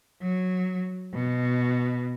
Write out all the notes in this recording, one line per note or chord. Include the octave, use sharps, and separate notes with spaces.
F#3
B2